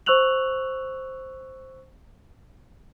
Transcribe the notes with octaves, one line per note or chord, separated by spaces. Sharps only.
C5 C#6 E6 F#6 F7 F#7